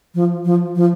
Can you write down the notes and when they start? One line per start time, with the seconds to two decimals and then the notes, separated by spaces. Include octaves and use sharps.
0.15 F3
0.45 F3
0.76 F3